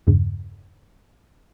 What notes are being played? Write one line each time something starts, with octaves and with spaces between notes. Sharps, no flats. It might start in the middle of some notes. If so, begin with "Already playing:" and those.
E2 G2 C#3